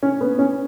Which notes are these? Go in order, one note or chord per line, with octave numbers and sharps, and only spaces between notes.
C#4
B3
C#4